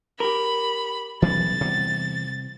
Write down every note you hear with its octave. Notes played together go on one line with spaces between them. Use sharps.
G4 A#4 B5
B1 E3 G3 C#4 A6
E2 C3 G3